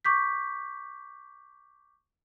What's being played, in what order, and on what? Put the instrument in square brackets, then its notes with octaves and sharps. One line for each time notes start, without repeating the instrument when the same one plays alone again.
[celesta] C#6 D6 G6 B6